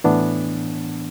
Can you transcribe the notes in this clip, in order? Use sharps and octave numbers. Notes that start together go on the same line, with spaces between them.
A2 E3 B3 D4